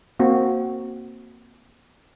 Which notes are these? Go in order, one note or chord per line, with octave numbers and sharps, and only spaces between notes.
A#3 C4 F#4